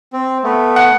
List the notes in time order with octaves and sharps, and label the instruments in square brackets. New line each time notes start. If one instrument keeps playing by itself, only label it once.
[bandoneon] C4
A3 B3
[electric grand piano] F#5